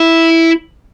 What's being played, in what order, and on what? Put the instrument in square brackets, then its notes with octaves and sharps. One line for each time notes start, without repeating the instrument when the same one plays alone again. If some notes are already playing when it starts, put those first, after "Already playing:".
Already playing: [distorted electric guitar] E4